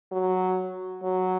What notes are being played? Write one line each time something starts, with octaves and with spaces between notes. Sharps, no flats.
F#3
F#3